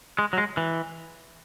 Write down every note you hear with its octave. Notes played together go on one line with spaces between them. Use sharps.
G#3
F#3
G#3
E3